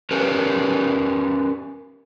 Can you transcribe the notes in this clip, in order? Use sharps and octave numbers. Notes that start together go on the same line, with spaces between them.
C#4 G4 A#4 B4 C#5 D5